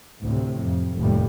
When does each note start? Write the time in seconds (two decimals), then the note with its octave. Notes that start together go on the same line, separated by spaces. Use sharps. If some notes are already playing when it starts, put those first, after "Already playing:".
0.21 D2 A2 C3
0.62 F2
0.97 F1 D#2 A2 G3